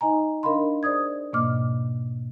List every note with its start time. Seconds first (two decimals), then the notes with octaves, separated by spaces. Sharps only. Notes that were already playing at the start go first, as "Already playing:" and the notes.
0.01 D#4 D#5 G#5 A#5
0.43 D4 A#4 D#5 F5 B5 C6
0.83 G#4 C5 D5 D#6 G#6
1.33 G#2 B2 A#3 D#5 D6 F6